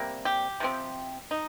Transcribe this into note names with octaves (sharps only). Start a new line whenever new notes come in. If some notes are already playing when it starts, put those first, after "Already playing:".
Already playing: C3 G3 A#3
G4
C3 F3 C4
D#4